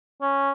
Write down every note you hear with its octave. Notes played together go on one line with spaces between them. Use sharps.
C#4